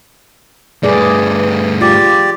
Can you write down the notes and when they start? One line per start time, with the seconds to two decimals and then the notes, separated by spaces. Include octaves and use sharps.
0.83 G2 A3 G#4 B4 D5
1.81 F4 G4 D5